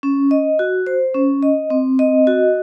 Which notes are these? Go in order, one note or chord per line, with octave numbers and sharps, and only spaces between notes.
C#4
D#5
F#4
C5
C#4
D#5
C4
D#5
F#4